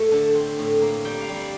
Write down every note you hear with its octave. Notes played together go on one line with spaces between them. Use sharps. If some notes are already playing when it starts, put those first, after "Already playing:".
Already playing: A2 A3
D3 A5
C4
A2
A#3
G3 G5
F5
G3
D5